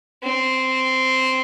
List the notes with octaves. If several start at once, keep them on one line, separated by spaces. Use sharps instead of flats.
C4